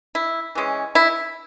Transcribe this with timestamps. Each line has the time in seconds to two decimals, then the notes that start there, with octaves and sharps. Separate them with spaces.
0.15 E4
0.55 E3 G#3 C#4
0.95 E4